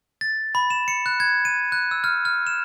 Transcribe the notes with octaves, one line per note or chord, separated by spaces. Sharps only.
A6
B5
E7
C#7
F#6
G#6
D#7
F#6
E6
F6
F6
E7